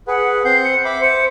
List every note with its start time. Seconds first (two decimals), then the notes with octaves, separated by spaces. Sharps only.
0.07 G#4 B4 F#5
0.45 C4 F#5 G6 C7
0.64 C#7
0.85 E5 B5 D6
1.01 C5